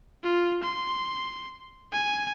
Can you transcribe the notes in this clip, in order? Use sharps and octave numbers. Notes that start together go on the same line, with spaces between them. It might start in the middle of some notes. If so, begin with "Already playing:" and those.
F4
C6
G#5